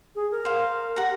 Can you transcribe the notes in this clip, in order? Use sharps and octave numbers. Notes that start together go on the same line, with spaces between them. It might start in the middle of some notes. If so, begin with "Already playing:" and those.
G#4
A#4
C5 F5
G4 F#5 A#5